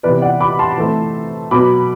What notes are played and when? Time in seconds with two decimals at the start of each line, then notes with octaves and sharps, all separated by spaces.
0.03 C3 E3 B3 B4 D5
0.22 D5 F#5
0.41 B5 D6
0.59 A5 C6
0.78 E3 A3 C4
1.51 B2 F#3 B3 B5 D6